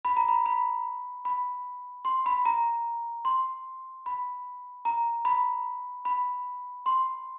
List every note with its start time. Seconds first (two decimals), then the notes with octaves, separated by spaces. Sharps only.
0.05 B5
0.17 A#5
0.28 B5
0.46 B5
1.25 B5
2.05 C6
2.26 B5
2.45 A#5
3.25 C6
4.06 B5
4.85 A#5
5.25 B5
6.05 B5
6.86 C6